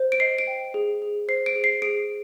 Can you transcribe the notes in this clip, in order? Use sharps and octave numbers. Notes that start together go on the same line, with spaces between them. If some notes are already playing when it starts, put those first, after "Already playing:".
Already playing: C5
D7
D#5 C7
D7
G5
G#4
G#4
C5 C7
D7
G#4
C7
G#4 D7